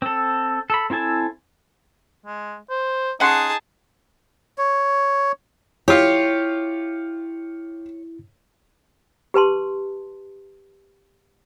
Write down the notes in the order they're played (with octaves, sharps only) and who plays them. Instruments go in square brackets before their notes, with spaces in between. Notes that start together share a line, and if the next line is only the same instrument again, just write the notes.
[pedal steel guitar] C4 A4
A4 B5
C4 E4 A4 G#5 A5
[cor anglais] G#3
C5
[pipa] C#4 F#5 C6 [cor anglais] D#4 [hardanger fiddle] G#4 A5
[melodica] C#5
[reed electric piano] E4 [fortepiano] F4 G4 [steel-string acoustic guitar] C#5
[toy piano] G4 B4 A5 C6